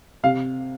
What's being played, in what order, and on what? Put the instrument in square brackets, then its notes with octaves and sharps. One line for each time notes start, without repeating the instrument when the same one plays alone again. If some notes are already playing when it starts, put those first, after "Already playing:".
[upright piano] C3 F5